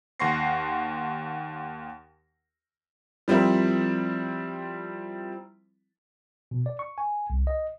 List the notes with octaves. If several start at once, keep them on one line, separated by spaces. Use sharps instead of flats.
D#2 F#5 C6 C#6 A#6 C7
F3 G3 C4 E4 A#4
B2
D5
C#6
G#5
C2
D#5